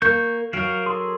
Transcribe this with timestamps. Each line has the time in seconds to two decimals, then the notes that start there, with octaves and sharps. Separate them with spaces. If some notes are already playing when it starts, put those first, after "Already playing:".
0.02 A#3 C#6 G6
0.53 F#3 F#4 A#4 F5 G5
0.86 G#4 A4 C6